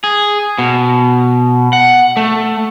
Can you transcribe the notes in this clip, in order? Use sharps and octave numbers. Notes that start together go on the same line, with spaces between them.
G#4
B2
F#5
A3